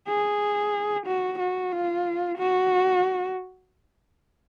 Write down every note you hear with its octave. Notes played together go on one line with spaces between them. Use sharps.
G#4
F#4
F#4
F4
F#4